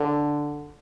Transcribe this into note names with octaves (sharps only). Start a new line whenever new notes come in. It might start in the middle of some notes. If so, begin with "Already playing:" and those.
Already playing: D3